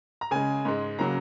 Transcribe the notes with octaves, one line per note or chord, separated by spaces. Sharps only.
A#5
C#3 G#3 G#5
G#2 G#3
C#3 F#3 A#3 A#5